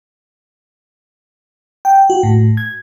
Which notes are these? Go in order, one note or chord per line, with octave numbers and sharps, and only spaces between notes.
G5
F#4
A2
G#6